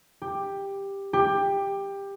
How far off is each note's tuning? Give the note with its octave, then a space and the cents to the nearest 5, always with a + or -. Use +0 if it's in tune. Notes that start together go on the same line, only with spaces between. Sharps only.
G4 +10
G4 +15